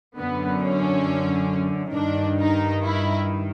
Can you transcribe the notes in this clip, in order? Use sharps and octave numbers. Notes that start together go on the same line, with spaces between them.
F#2 D3 B3
C#4
G2 D#3 D4
D#4
E4